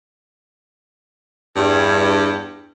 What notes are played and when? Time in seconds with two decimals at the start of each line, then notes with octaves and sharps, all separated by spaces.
1.56 E2 G2